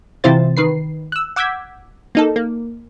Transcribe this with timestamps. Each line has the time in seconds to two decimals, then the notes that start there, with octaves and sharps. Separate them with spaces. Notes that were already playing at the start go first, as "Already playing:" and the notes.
0.24 C3 E3 E4 F4 C5 A6
0.57 D#3 B4 C7
1.12 E6 F#6
1.36 F#5 D6 E6 G6 G#6 B6
2.15 A#3 D#4 A4
2.36 A#3